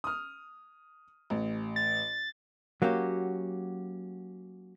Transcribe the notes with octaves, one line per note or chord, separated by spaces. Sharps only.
D#6 F6
A1
A6
F#3 A#3 C#4 F#4 G4